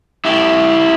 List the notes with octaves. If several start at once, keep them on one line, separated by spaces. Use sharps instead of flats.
E4 G4